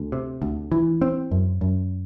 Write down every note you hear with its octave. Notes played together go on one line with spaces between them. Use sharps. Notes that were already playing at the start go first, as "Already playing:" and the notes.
Already playing: D2
C3
D2
E3
C4
F#2
F#2